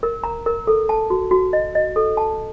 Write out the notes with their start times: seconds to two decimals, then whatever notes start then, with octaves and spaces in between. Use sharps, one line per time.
0.03 A#4
0.24 A#5
0.46 A#4
0.67 A4
0.89 A5
1.10 F#4
1.31 F#4
1.53 D#5
1.75 D#5
1.96 A4
2.17 A5